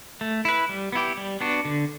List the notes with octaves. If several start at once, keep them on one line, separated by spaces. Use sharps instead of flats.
A3
E4 B4
G3
B3 E4 G4
G3
B3 D4 F#4
D3